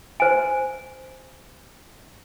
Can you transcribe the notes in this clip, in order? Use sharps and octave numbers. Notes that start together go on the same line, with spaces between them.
C5 G#5